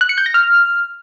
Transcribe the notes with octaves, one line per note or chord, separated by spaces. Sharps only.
F#6
C#7
G6
A#6
F6